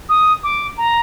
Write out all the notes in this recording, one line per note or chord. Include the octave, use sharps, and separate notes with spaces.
D#6
D6
A#5